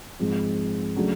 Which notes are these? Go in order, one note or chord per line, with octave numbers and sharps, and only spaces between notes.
G#2 F3 G#3 C4
C#3 F#3 A3 D4